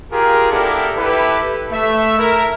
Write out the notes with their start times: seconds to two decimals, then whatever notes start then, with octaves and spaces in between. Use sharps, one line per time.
0.12 F4 G4 G#4 A#4
0.51 B3 D4 E4 G4 A4 A#4
0.97 E4 G4 A4 B4
1.72 A3 E5
2.18 E4 A#4